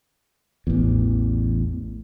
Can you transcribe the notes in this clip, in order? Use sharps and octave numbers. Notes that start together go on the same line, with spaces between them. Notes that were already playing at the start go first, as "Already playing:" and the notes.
A1 E2